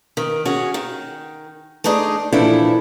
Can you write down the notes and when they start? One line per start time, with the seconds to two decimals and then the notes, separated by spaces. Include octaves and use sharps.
0.17 D#3
0.45 C#4 F#4 G#4
0.74 D#3
1.84 A3 D4 D#4 G#4 D5
2.32 A#2 E3 F3 D4 E4 A4